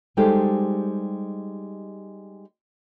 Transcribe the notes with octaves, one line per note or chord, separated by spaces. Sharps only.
G3 G#3 D#4 G4 A4 C5